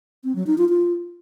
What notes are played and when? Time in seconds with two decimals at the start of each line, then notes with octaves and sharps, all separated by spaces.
0.24 C4
0.35 F#3
0.47 D#4
0.58 F4
0.69 F4